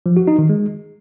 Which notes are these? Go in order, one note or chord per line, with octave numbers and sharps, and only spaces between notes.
F3
F#4
D#4
D#3
G#3